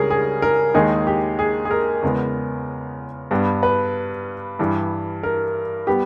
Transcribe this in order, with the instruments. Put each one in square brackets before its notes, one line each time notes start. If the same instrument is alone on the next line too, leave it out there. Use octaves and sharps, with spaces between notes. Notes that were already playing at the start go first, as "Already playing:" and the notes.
Already playing: [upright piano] C#2 C#3 G3 C#4 G#4 A#4
G#4
A#4
D#2 D#3 G#3 D#4 G#4
G4
G#4
G#4
A#4
E2 C#3 G#3 B3
G2 G3 B3
B4
G2 E3 G3
A#4
G3 B3 G4